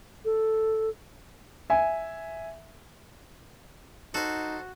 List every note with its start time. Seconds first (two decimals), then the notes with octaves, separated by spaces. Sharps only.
0.25 A4
1.70 E5 G#5
4.14 D#4 F#4 A4 C5